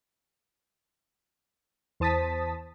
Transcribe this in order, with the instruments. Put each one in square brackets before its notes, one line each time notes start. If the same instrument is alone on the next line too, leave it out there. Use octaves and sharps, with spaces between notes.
[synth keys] E2 C5 A5 D#6 A6 B6